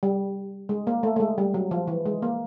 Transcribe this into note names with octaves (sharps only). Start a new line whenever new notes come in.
G3
G#3
A#3
A3
A3
G#3
G3
F#3
F3
E3
G#3
A#3